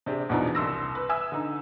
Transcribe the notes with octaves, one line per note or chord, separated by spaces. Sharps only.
C3 D4 G4 G#4
E2 B2 E3 F3 D4 D#4
C2 C6 E6 A#6
B4
E5 G#5 D#6 E6
D3 D#4